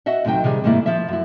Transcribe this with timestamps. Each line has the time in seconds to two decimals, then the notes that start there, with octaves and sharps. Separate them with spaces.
0.06 F#4 D#5 E5 F#5
0.25 D2 C3 F#3 D#4 G5
0.44 C3 D#3 G3 G#4
0.64 G#2 D#3 G3 A3 A#3 E4
0.86 F3 F4 E5
1.08 F#2 E4